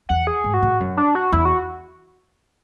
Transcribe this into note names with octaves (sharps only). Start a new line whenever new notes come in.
E2 F#5
G#4
G#2
F#4
A2
F#2
D4
F#4
E2 E4
F#4